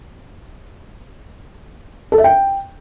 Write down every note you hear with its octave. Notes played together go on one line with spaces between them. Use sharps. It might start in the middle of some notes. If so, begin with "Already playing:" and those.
A4
E5
G5